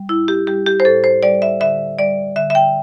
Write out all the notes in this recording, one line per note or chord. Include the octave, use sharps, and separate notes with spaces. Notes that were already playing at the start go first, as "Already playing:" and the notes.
Already playing: G3
A2 E4
G4
G3 G4
G4
C5
A2 A4
C5
G3 D5
E5
D3 E5
G3 D5
D3 E5
E5
G5